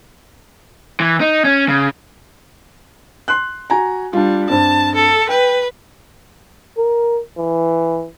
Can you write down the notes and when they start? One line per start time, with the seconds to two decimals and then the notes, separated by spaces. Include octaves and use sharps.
1.00 E3
1.21 D#4
1.45 C#4
1.68 C#3
3.28 C6 F#6
3.70 F#4 G#5 A#5
4.13 G3 D4 F4
4.49 G2 C4 A5
4.95 A4
5.29 B4 G5
6.77 A#4
7.38 E3